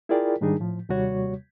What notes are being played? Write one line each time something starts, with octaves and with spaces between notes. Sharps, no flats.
E4 F4 G#4 A#4 D5 G5
G#2 D#3 G3 D4 D#4 G#4
A2 F3
D#2 C3 G3 F#4 C#5